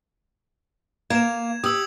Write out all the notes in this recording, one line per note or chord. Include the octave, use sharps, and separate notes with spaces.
A#3 G#6 E7
G4 D#6 E6 F#7